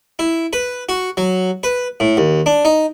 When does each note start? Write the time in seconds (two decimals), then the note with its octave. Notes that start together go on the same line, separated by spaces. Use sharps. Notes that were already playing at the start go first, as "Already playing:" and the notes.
0.19 E4
0.53 B4
0.89 F#4
1.17 F#3
1.63 B4
2.00 A2
2.17 D#2
2.46 D4
2.65 D#4